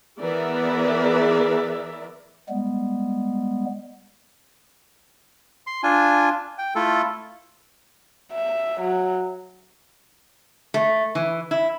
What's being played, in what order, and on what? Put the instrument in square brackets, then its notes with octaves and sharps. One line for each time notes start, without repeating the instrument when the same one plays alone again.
[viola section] E3 B3 G#4 A#4 D5 E5
[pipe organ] G3 G#3 B3
[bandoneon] C6
D4 F4 G#5
G5
A3 E4 F4 A4
[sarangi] E5
F#3
[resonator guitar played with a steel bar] A3
E3
E4